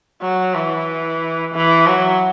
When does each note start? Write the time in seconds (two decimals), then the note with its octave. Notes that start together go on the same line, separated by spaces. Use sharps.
0.22 F#3
0.55 E3
1.54 E3
1.87 F#3